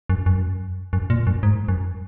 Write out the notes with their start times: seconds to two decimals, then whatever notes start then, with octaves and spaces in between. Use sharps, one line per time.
0.09 F#2
0.26 F#2
0.93 F#2
1.10 A#2
1.27 F#2
1.43 G#2
1.68 F#2